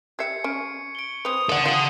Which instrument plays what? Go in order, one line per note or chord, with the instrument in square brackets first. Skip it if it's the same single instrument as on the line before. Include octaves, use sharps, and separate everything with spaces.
[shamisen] G4 E5 [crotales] G#6 C7 C#7
[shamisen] C#4 [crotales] C#6 D7
[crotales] D7 G7
[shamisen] C4 B4 [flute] D#6 [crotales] F7
[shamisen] D#3 D5 [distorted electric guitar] A4 F#5 [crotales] C#7 D#7
[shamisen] F4 G4